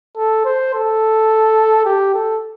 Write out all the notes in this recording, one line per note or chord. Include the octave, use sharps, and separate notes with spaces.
A4
C5
A4
G4
A4